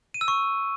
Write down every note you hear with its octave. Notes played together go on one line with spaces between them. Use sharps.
D#7
E6
C#6